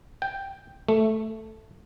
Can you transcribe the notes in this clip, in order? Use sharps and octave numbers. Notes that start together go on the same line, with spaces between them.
G5
A3